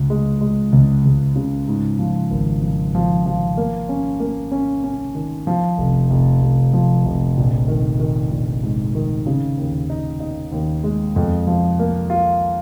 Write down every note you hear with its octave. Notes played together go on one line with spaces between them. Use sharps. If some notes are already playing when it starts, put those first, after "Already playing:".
Already playing: C#2
G#3
G#3
C#2
C#2
C#3
G#2
F3
G#1
F3
F3
F3
A#3
C#4
A#3
C#4
C#4
D#3
F3
F1
F1
F1
F3
F1
A#1
D#3
D#3
A#1
G#2
D#3
C#3
D#2
D#4
D#4
D#2
G#3
F2
F3
A#3
F4